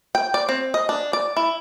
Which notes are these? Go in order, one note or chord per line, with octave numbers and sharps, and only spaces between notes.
G5
D5
C4
D#5
D4
D5
E4